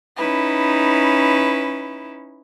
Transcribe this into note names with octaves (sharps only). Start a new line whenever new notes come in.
C#4 D#4 E4 B4